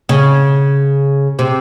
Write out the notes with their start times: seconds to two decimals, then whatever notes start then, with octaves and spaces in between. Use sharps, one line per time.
0.09 C#3
1.39 C3